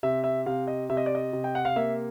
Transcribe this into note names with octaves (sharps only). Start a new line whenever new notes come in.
C3 E5
E5
C3 F5
D#5
C3 E5
D#5
D5
D#5
C3
G5
F#5
F5
A#3 E5